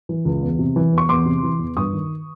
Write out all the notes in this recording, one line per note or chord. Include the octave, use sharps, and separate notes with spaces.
E3
C#2
E2
C3
E3
E2
C#6
E2 C6 D6
C3
E3
E2
G2 C#6 D#6
D#3